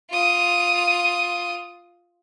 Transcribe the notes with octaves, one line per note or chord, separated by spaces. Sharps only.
F4 D#6